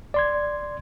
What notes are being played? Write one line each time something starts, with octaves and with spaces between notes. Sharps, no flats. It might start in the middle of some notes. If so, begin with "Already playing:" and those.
D5 C6 G#6